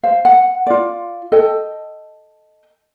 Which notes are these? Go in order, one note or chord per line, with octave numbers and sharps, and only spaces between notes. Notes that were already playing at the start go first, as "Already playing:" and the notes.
C5 F5
F#5
F4 D5
A4 D#5 G5